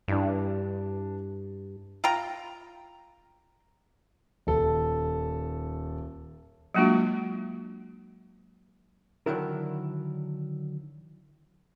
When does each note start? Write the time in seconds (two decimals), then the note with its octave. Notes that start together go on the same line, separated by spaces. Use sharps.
0.08 G2 E3 D4
2.04 F4 G5 A#5
4.47 D#1 A4
6.74 F#3 G#3 A#3 D4 F4 F#4
9.26 D3 D#3 F#3 D4 E4 A#4